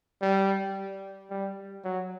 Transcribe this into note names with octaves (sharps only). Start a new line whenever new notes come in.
G3
G3
F#3